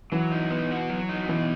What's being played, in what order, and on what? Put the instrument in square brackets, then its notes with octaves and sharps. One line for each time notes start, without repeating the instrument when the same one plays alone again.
[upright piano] E3 [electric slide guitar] F#3
[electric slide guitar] D#4
B3
F#4
F#3
D#4
[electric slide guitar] B2 [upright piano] E3